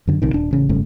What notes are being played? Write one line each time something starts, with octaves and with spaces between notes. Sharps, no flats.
F#2 D3
B1 C3 D#3
D#1 D4
A1 C#3
F#1 G2 C#3 A3